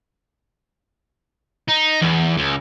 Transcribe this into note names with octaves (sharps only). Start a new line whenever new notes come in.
D#4
E2
C#2